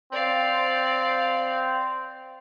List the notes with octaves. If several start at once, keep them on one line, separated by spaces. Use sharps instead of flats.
C4 D5 F5